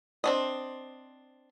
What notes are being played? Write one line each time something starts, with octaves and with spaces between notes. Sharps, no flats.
C4 D4 D#5